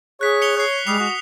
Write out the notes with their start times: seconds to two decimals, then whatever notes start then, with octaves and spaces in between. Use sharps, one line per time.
0.21 G#4 C#5 F#6 B6
0.42 C#7 F7 G7
0.57 C#5 F#6 C7
0.87 G3 G#3 D#6 C7 F7
1.00 F#4 D#6